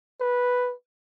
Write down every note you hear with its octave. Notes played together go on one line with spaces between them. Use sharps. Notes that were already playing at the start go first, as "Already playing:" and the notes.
B4